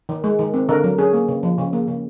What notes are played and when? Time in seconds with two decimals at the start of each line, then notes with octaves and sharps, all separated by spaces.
0.09 D#3
0.24 G#3
0.39 D#3
0.54 C4
0.69 D3 A#4
0.84 F#3
0.98 C#4 G#4
1.13 A#3
1.28 C#3
1.43 F3
1.58 C#3
1.73 A#3
1.88 C#3